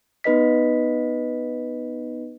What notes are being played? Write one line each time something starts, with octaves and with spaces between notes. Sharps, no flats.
B3 D#4 B4 D#5 B6